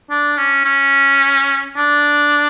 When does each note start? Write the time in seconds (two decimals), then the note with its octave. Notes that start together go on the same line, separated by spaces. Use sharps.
0.10 D4
0.37 C#4
0.65 C#4
1.76 D4